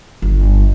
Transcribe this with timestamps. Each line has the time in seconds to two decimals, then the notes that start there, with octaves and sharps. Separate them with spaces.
0.22 G1